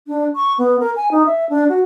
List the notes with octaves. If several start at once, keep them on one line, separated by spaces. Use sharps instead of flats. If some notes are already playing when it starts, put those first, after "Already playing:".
D4
C#6
B3
A#4
G#5
D#4
E5
D4
F#4